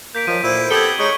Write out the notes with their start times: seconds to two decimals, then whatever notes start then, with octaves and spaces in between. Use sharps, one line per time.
0.15 A#3 G6 B6 D7
0.27 D#3 F3 F#3 D#7
0.43 D2 A#2 E4 A#4 C5
0.71 B3 C4 G4 A4 G#6 F#7 G7
0.99 G#3 D#4 C#5 C#6